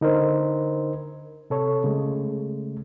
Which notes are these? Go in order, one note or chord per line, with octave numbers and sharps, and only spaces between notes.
D3 D#4 A#4 C5
C3 A4 C#5
C#3 G#3 A3